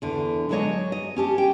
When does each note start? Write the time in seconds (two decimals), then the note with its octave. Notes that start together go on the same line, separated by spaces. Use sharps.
0.02 E2 D3
0.49 F#3 G#3 D4 C5 C#5 D#5
0.92 D#5
1.16 C#4 G4 A5
1.38 G5